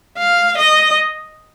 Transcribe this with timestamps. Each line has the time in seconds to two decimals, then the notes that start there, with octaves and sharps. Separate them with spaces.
0.18 F5
0.57 D#5